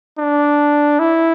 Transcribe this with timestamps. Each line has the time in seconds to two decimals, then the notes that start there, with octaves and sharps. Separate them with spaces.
0.18 D4
0.99 E4